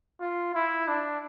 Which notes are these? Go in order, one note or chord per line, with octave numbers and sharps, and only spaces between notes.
F4
E4
D4